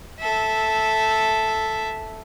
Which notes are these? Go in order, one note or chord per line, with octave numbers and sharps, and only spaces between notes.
A4 E5